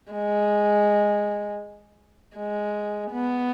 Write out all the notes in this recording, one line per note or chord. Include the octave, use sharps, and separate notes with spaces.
G#3
G#3
B3